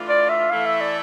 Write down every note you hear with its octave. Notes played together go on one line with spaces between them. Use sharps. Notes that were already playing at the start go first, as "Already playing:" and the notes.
Already playing: E3 A3 D4 F4
D5
E5
E3 A3 E4 F5
E5
D5